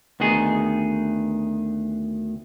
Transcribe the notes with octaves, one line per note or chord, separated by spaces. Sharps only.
D2 D#3 B3 D#4 G#4